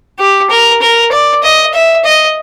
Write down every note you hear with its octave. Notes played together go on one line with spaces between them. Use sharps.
G4
A#4
A#4
D5
D#5
E5
D#5